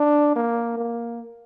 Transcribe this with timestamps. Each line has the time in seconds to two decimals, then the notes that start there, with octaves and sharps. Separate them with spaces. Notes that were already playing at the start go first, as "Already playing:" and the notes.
Already playing: D4
0.36 A#3
0.78 A#3